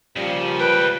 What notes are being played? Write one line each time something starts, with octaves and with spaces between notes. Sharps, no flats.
A#2 C#3 F3 G3
C#2 B4 G5